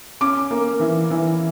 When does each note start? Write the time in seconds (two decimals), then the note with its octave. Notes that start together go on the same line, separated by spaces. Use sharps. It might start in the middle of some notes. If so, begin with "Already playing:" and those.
0.21 C#4 D6
0.51 A#3
0.80 E3
1.10 E3